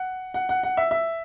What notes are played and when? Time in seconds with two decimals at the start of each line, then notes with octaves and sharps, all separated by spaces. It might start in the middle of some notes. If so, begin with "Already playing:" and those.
Already playing: F#5
0.34 F#5
0.49 F#5
0.63 F#5
0.77 E5
0.91 E5